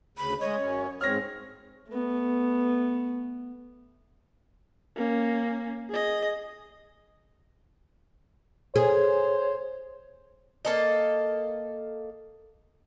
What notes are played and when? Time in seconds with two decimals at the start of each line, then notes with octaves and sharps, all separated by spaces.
0.17 D2 C#3 B5
0.41 G#3 C#5 D#5
0.57 F#2 C#4
1.01 G#2 C4 C#5 F6 A#6
1.89 A3 B3
4.96 A#3 C#4
5.90 G#4 D#5
8.76 G#4 C5 C#5
10.65 A#3 A4 D#5